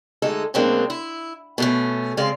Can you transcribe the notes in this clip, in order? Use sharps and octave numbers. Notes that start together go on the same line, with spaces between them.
D2 G#3 D#4 A4
B2 F#3 G#3 A#3 C4 D4
E4
B2 A3 C#4
C#3 G#3 C4 D5 F5